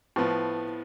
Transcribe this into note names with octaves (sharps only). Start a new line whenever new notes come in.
A2 F3 B3